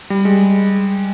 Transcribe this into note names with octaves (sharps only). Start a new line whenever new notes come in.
G3
G#3